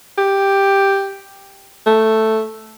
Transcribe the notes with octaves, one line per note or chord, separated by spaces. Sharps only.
G4
A3